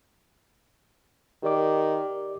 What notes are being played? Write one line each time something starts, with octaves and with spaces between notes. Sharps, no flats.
D#3 G4 D5 D6